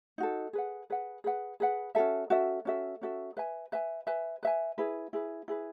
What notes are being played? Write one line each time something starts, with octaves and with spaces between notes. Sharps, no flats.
D#4 F#4 A4
G#4 B4 F#5
G#4 B4 F#5
G#4 B4 F#5
G#4 B4 F#5
C#4 F#4 A4 E5
C#4 F#4 A4 E5
C#4 F#4 A4 E5
C#4 F#4 A4 E5
B4 E5 G#5
B4 E5 G#5
B4 E5 G#5
B4 E5 G#5
E4 G#4 B4
E4 G#4 B4
E4 G#4 B4